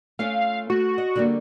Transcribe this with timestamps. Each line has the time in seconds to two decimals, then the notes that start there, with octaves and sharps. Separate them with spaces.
0.19 A3 C#4 F4 F5
0.70 A3 F#4
0.98 D#5
1.16 D3 G3 A#3